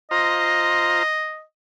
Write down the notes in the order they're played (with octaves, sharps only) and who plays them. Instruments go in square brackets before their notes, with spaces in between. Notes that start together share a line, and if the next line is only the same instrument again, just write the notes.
[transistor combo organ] F4 C5 A#5 [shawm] D#5